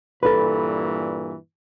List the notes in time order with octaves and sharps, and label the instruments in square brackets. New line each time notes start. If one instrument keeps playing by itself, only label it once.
[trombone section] G2 A#2 E3 [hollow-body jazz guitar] A4 B4